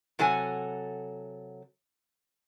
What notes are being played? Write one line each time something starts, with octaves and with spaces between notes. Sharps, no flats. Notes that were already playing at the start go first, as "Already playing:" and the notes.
C3 F#3 A4 F#5 G#5